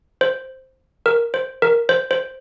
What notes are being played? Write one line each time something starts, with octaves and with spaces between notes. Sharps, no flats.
C5
A#4
C5
A#4
C5
C5